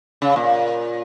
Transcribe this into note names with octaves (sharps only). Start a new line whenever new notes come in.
C#3
A#2